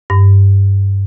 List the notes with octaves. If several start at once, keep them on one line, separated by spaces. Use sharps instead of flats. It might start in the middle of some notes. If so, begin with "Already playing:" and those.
G2